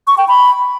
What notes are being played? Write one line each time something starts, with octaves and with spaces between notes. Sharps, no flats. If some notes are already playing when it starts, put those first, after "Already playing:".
C#6
G5
B5